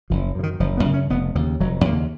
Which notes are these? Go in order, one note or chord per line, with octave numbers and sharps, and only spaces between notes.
F#1 F3
F#2 C#3
D#3
F#1 F3
B3
F#2 C#3
C#4
F1 B3
D#2 C#3 F3
F1 F#3
D#2 C#3 A#3